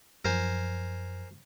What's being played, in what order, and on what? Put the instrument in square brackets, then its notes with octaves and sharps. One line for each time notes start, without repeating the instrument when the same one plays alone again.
[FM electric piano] F#2 F3 [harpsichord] A#4 C5 G#5